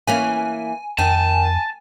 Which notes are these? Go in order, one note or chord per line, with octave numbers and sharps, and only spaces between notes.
E3 A#3 C#4 G#5
F2 D#3 G#5 A5